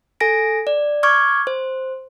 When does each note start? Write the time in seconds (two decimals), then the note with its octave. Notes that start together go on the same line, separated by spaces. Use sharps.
0.20 A4 G#5 A#6 D7
0.67 D5
1.03 C#6 D6 F6 G#6
1.47 C5